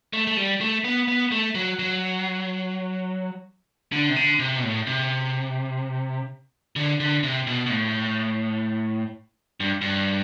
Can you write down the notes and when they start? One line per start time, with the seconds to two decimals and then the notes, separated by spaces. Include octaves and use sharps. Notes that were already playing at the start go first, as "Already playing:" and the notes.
0.13 A3
0.27 A3
0.37 G3
0.61 A3
0.84 B3
1.08 B3
1.32 A3
1.55 F#3
1.79 F#3
3.92 D3
4.09 C3
4.16 D3
4.39 C3
4.58 B2
4.63 A2
4.87 C3
6.76 D3
7.00 D3
7.23 C3
7.47 B2
7.66 B2
7.70 A2
9.60 G2
9.81 G2